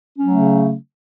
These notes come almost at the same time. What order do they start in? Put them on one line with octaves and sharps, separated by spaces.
C#4 F#3 A3 C#3